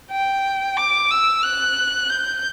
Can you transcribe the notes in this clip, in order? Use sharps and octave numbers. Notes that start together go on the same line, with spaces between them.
G5
D6
E6
F#6
G6